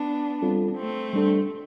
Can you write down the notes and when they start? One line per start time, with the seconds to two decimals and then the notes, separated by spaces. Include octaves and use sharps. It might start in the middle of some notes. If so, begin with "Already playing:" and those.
Already playing: B3 D4
0.42 G3 C4 F4 A4
0.77 A3 C4
1.13 G3 D4 A4